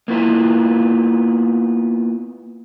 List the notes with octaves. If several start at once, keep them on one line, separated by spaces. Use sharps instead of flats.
A#3 B3 E4 F4